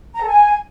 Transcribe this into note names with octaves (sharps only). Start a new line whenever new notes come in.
A#5
A4
G#5